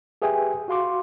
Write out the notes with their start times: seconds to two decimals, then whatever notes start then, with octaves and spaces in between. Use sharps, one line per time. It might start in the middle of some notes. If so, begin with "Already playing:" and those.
0.22 G4 G#4 B4 E5 G5 G#5
0.68 F#4 F5 C6 D6